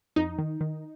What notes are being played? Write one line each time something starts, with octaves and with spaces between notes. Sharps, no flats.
F2 D#4
D#3
D#3